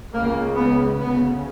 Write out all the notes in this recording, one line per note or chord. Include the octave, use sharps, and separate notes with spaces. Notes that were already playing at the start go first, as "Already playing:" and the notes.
C#2 C#3 A#3
B3
D2 C#3 B3